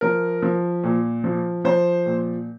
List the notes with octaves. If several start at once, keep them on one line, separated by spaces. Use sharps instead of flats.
F3 A#4
F3
A#2
F3
F3 C5
A#2